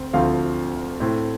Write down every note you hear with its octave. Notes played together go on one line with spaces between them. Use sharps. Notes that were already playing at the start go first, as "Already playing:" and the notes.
Already playing: D2 C4
D2 D3 F3 A3 C4 F5
A2 A3 C4